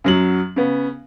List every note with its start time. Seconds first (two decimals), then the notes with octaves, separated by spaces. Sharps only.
0.04 F#2 F#3 F#7
0.56 C#3 B3